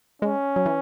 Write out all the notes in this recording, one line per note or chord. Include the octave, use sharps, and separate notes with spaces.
G#3 C#4
F#3
E3